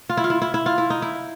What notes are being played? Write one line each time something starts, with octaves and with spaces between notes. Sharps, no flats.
F4
E4
F4
E4
E4
E4
F4
E4
D#4
E4